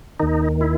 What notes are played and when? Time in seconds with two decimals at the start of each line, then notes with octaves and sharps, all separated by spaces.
0.20 D#2 D#3 D#4
0.61 E4